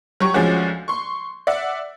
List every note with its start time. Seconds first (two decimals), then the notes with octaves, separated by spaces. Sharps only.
0.20 F#3 G4 C#6
0.34 D2 F3 G#3 C#4 F#4 D6
0.88 C6 C#6
1.47 D5 E5 F#5